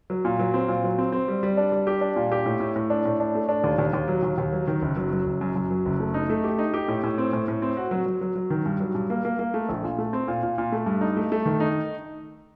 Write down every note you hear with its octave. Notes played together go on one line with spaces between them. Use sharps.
F#3
A#2
F#3
C4
A#2
F#3
C4
C4
G3
G3
D4
G3
G4
D4
A#2
G4
A2
A2
A2
D4
A2
D4
A3
D4
D#2
D#2
D#2
F#3
D#2
D#2
F#3
D#3
F#1
F#3
F#3
F#1
F#2
F#2
F#3
F#1
A3
D#4
A3
G4
D#4
G4
A2
A2
C4
A2
A2
C4
F#4
F#3
F#3
F#3
F#3
D#3
G2
F#3
G2
A#3
A#3
A#3
A3
A#1
A#2
A3
C4
A#2
A#2
A#2
A3
G2
D#4
A3
A3
D#3
D#4